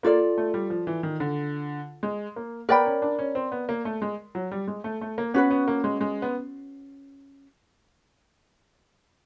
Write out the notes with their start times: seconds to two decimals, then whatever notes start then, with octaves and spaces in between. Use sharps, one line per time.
0.03 A#3 F4 A4 D5
0.38 A3
0.54 G3
0.70 F3
0.87 E3
1.03 D#3
1.20 D3
2.03 G#3
2.36 A#3
2.69 B3 A#4 D5 G5 B5
2.86 C#4
3.02 D4
3.19 C#4
3.35 C4
3.52 B3
3.69 A#3
3.85 A3
4.02 G#3
4.35 F#3
4.51 G3
4.68 G#3
4.84 A3
5.01 A3
5.18 A#3
5.34 B3 C#4 F#4 B4
5.51 B3
5.68 A#3
5.84 G#3
6.01 G#3
6.22 B3